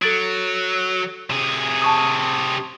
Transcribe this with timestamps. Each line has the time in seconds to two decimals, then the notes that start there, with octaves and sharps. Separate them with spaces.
0.02 F#3 A4 A6 D7
1.30 C3 G#4
1.82 A5 C#6 D#6